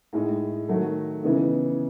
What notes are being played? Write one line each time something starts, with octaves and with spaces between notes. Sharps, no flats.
A2 G#3 D#4
D#3 F#3 A3
C#3 E3 B3 D#4